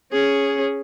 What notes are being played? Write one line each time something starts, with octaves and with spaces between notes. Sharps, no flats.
C#4 G#4